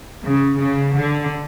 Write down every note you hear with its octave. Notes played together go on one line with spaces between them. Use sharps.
C#3
C#3
D3